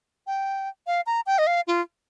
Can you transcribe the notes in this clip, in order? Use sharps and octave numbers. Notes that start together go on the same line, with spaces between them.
G5
F5
A#5
G5
D#5
F5
F4